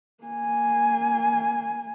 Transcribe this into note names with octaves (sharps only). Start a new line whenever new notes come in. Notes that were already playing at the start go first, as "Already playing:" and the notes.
A#3 G#5